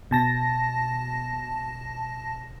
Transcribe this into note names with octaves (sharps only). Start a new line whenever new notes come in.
B2 A5 A#6